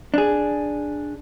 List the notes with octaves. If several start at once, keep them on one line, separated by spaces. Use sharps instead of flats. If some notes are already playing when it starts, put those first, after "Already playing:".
D4 G#4